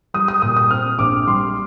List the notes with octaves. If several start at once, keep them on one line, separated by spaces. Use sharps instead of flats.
G3 D#6
D#6
A#2 D#6
D#6
C4 F6
A#1 D6
G3 C6